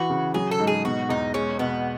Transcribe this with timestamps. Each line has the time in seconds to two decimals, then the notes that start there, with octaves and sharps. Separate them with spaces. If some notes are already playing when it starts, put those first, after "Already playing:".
Already playing: E3 F#4
0.10 C#3
0.34 F#3 G#4
0.51 A4
0.59 G#2
0.67 G#4
0.84 B2 F#4
1.09 E2 D#4
1.34 G#3 C#4
1.59 B2 B3